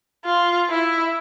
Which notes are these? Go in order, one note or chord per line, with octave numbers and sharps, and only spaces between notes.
F4
E4